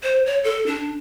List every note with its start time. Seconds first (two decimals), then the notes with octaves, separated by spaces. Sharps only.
0.03 C5
0.26 C#5
0.44 A4
0.66 D4